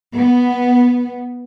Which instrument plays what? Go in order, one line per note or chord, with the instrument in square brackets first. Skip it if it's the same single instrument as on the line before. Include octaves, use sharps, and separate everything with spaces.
[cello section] B3